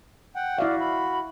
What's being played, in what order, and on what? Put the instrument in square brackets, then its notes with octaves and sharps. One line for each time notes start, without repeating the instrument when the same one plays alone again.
[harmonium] F#5 G5
[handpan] E4 E5 F5 [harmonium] F#4 [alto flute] D5
[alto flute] B5